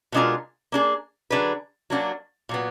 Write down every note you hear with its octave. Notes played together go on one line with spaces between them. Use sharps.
B2 G#3 D4 F4 A#4
A#3 D4 G#4
D3 F#3 D4 G#4 B4
F#3 A#3 D4 F#4
A#2 F#3 B3